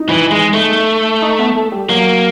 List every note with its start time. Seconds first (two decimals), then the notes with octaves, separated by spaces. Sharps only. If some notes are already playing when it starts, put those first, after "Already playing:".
Already playing: D#4
0.09 E3
0.31 G#3
0.53 A3
1.22 D#4
1.39 B3
1.56 A3
1.72 G3
1.89 F#3 A#3